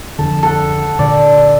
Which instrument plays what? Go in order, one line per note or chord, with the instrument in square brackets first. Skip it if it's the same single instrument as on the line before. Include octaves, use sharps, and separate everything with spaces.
[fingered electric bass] F2 D3 [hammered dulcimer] A4
[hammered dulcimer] A4 F#5
[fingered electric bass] A#2 D3 [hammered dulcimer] D5